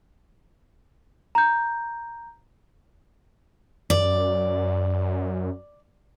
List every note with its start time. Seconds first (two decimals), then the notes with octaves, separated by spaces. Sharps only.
1.35 A#5 G6
3.90 F#2 D5